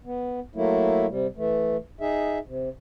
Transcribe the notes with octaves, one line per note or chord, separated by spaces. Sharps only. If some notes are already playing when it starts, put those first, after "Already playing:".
B3
F#3 A3 A#3 E4
C3 G3
E3 A3
D#4 G#4 E5
C3